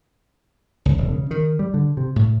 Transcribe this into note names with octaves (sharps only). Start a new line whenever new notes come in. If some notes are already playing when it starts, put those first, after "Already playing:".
C#2
E1
C#3
D#3
G3
D3
C3
A2